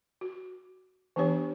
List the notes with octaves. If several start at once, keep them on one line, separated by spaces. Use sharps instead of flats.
F#4
E3 B3 D4 G4 C#5